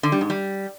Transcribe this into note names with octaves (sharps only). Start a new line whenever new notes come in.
D3
G3
G#2
G3